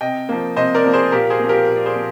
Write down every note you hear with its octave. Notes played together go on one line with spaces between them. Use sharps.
C3 D#5 G5
F3 A#3
C3 C5 D#5
A#4 D5
F3 A#3
G#4 C5
A#2 G4 A#4
G#4 C5
F3 A#3
G4 A#4
A#2
D5
G#4 C5
F3 A#3